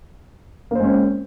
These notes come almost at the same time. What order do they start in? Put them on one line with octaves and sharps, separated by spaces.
A#3 C5 G#3 C#4 C4